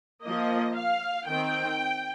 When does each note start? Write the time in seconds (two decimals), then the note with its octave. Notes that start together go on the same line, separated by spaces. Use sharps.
0.23 F3 A#3 D#5
0.76 F5
1.28 D#3 C4 G5